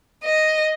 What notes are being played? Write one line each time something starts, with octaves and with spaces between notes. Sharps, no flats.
D#5